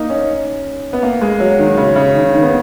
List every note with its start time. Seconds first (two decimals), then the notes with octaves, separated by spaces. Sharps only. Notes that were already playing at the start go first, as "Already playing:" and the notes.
Already playing: A#3 D#4
0.10 C#4
0.93 B3
1.03 A#3
1.21 G#3
1.40 F#3
1.59 D#3
1.77 C#3
1.96 C#3
2.15 D#3
2.33 D#3
2.43 B3